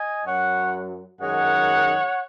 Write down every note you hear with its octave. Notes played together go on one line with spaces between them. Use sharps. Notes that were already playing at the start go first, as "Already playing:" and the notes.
Already playing: D#5 G#5
F#2 F#3 C#5 F#5
F#2 D#3 G#3 C#5 F#5